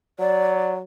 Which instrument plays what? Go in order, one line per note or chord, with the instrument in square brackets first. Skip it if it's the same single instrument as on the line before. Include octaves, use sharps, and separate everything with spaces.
[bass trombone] F#3 [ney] D5